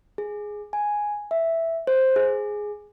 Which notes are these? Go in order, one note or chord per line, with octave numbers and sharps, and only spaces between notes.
G#4
G#5
E5
C5
G#4